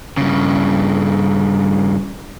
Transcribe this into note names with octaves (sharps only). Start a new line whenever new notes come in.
G2 C#3